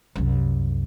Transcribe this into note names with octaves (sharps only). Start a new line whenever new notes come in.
C2 F#2